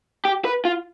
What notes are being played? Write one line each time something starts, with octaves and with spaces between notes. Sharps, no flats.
G4
B4
F4